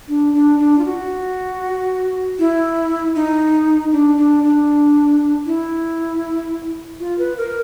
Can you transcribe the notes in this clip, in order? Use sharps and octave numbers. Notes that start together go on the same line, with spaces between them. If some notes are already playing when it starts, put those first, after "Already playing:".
D4
D4
D4
F4
F#4
E4
D#4
D4
D4
D4
E4
F4
B4
A#4